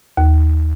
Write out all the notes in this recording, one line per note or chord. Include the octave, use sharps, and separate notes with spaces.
D#2